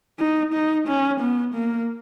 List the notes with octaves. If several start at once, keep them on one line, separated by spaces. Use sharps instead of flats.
D#4
D#4
C#4
B3
A#3